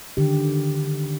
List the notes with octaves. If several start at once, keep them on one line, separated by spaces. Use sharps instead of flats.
D3 D#3 G4